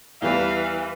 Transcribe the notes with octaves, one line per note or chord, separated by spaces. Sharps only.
E2 E3 G3 F5 B5